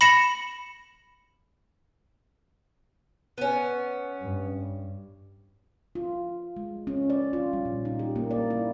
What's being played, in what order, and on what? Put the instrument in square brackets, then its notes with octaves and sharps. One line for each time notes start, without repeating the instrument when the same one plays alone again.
[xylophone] B5 A#6 C#7 E7 F#7
[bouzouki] B3 C#4
[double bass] G2
[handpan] F4
G#3
C#4
D5
F4
G3
A#2
D#4
G4
A#3
D5
E4